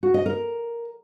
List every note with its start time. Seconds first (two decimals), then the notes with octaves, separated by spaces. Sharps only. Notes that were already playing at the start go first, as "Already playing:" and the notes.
0.03 F#4
0.14 D#5
0.26 A#4